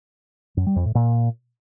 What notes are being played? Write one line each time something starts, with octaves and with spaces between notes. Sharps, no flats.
F#2
G3
F2
A2
A#2